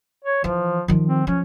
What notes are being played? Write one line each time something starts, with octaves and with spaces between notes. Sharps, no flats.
C#5
E3 F3
D#3 F3
C4
F3 C#4